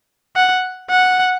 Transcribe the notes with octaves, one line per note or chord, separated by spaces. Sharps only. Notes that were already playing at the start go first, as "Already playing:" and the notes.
F#5
F#5